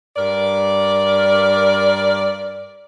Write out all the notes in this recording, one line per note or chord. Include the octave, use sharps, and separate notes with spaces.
G2 A#4 D5